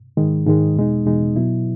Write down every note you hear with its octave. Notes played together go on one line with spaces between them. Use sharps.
G#2 D#3 G#3
G#2 D#3 G#3
E2 B2 G#3 D#4
E2 B2 G#3 D#4
B2 F#3 B3 E4